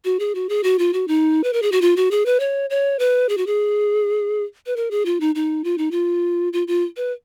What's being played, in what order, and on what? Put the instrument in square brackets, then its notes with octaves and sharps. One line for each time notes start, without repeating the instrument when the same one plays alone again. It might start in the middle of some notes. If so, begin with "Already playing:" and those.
[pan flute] F#4
G#4
F#4
G#4
F#4
F4
F#4
D#4
B4
A#4
G#4
F#4
F4
F#4
G#4
B4
C#5
C#5
B4
G#4
F#4
G#4
B4
A#4
G#4
F4
D#4
D#4
F4
D#4
F4
F4
F4
B4